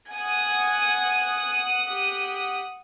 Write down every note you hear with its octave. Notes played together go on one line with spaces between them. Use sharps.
F#5 G#5 D#6
G4